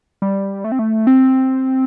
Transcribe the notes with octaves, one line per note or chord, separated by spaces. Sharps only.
G3
A3
C4
A3
C4